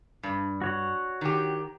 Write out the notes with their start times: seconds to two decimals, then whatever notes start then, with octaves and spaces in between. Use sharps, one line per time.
0.23 G2
0.62 F#4 C#5 F#5
1.21 D#3 G4